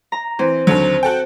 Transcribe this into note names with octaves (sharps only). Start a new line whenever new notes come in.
A#5
E3 C4
D#2 D3 F#3
F#4 A4 G5